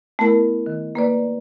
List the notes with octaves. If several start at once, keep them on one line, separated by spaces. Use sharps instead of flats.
A3 B3 E4 A#4
D#3
A#3 B4 D5